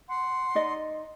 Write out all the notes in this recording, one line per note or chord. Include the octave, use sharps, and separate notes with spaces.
F#5 C6
D#4 D5 D#5